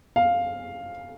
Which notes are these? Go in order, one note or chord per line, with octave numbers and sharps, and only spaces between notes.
F5